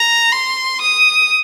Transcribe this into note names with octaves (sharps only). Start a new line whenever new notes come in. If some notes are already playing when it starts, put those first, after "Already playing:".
Already playing: A#5
C6
D#6